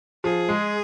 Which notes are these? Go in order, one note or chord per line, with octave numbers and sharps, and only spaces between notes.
F3 G#4
G#3